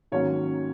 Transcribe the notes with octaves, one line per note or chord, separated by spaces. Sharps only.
G#2 D#3 F#3 A#3 C#4 C#5